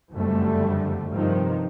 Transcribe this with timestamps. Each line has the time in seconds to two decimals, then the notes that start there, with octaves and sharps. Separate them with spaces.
0.13 F#1 F2 D3 G3 A3
1.13 G2 C3 D#3 F3